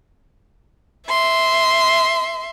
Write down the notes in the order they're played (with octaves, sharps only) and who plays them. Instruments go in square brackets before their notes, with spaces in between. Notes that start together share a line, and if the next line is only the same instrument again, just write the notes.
[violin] E5 C6